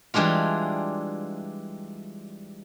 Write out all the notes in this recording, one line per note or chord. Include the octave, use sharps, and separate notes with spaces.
E3 G3 G#3 D4 F4